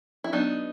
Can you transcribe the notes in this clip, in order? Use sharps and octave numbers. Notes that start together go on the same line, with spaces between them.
E4
F#3 B3 D4 D#4